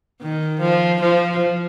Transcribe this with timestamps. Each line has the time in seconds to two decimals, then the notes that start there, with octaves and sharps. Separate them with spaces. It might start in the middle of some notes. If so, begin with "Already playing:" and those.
0.22 D#3
0.61 F3
1.01 F3